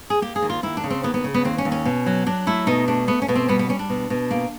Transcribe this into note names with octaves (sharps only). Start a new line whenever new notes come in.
G#4
A#3 G4
G#4
D#2
F4
D#2 E4
D4
C#3
C4
D#2 B3
B3
C#3
B3
D#2 C4
C#4
D#2
C#4
B2
F#3
F#3 D4
A3 E4
B2 D#4
A3 D4
A3 B3
C#4
B2 B3
C4
G3 B3
B3
G3 C#4
D4
B2
B2
A#3